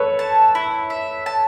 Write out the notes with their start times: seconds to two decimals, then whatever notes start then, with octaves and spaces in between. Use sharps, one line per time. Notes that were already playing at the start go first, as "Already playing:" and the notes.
Already playing: A4 B4 C#5
0.19 A5
0.55 E4
0.90 E5
1.26 A5